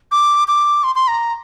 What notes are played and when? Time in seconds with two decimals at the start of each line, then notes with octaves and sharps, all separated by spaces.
0.12 D6
0.48 D6
0.84 C6
0.95 C6
1.08 A#5